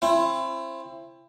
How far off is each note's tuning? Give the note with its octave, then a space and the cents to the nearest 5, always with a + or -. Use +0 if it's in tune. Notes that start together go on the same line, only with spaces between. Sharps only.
C4 +25 E4 +30